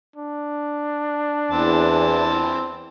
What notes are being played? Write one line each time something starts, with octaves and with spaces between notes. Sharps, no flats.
D4
E2 E3 C4 A5